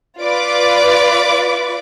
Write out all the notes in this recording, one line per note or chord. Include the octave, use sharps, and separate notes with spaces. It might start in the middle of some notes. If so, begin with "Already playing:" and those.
F4 B4 D5 D6